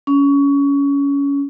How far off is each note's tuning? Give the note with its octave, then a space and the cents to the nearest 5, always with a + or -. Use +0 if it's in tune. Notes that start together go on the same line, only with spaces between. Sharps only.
C#4 +20